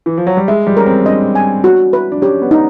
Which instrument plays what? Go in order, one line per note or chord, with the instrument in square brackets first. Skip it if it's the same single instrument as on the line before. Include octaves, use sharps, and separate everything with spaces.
[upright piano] E3
F3
F#3
G3
[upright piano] G#3 [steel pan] E5
[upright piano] G3
[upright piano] C#4 [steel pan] A#4
[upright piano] C4
[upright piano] D4 [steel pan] D#5
[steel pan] G#5
F#4
B4
[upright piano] D4
[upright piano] C#4 [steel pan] G4
[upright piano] B3
[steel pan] D#4